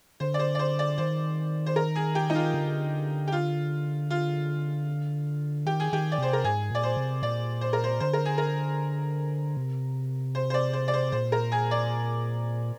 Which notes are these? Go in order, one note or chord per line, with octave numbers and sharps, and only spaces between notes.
D3 C5
D5
C5
D5
C5
D5
D#3 C5
C5
A#4
G#4
G4
D#4
F4
D3
G4
F4
F4
D#3 G4
G#4
D#3 G4
D5
C3 C5
A#4
G#2 G#4
A#2 D5
C5
C3
A#2 D5
C5
A#4
C5
D3 C5
A#4
G#4
A#4
C3
C5
C5
D5
C5
D5
C5
A#2 C5
A#4
G#4
D5